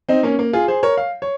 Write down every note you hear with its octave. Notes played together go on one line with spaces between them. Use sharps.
C4 D#4
A#3 C#4
A#3
F4 G#4
G#4 C5
A#4 C#5
F5
C#5